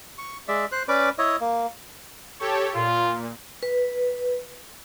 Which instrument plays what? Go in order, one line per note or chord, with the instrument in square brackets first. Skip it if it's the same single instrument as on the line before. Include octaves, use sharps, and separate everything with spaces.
[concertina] C#6
G#3 D5 E5
C5 F#6
C#4 B4 D5 D6
E4 C#5 D#5
A#3
[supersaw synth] G4 A4 C#5
[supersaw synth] A#2 [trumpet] F4
[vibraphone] B4